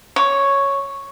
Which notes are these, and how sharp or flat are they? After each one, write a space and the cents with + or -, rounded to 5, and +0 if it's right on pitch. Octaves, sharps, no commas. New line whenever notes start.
C#5 +0 D6 -30